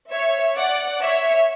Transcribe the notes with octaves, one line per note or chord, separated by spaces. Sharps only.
C#5 E5
D5 F#5
C#5 E5